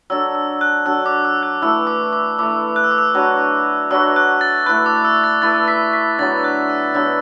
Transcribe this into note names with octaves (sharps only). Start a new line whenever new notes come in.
F#3 D4 A4 E6
E6
F#6
F#3 D4 A4 E6
D6
E6
F#6
E3 A3 E4 E6
D6
D6
E3 A3 E4 D6
F#6
E6
D6
E6
F#3 D4 F#4 B4
F#3 D4 F#4 B4 E6
F#6
A6
A3 E4 B4 F#6
D6
E6
A6
A3 E4 B4 A6
B6
B6
D3 F#3 B3 A6
F#6
E6
D3 F#3 B3 E6